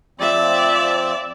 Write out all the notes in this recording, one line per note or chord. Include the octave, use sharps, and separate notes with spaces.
F3 C4 D5 E5